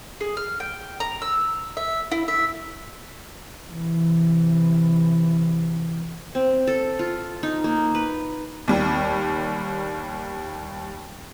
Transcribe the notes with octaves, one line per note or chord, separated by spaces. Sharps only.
G#4
F6
G5
A#5
E6
E5
E4
E5
C3 E3
C4
A4
F4
D#4
A#3
B4
D#2 G3